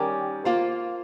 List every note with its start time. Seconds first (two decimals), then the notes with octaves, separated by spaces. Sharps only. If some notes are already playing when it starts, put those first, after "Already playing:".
Already playing: D#3 G3 C#4 G4 A#4
0.45 A#3 F4 C5